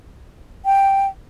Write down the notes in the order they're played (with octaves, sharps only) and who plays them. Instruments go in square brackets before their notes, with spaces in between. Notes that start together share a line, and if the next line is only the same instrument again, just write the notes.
[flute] G5